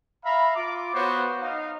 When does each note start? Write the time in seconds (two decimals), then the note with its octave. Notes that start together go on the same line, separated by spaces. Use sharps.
0.23 E5 F5 A#5 B5
0.55 F4 D6
0.93 B3 F#4 C5 C#5
1.40 D#4 F5